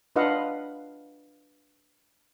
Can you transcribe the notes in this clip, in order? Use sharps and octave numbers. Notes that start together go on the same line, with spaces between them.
D4 F4 B4 D#5 F5 F#5